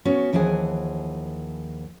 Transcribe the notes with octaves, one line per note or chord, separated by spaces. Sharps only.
B3 C#4 F#4
D#2 E3 F3 G#4 F#5 G#5